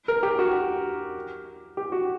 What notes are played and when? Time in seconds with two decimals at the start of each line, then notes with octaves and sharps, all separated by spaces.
0.08 A#4
0.23 G4
0.39 F#4
1.77 G4
1.92 F#4